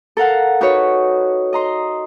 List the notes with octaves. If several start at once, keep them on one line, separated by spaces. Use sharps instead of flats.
A4 A#4 F5 F#5
D#4 F#4 B4 C#5
D#5 A#5 C6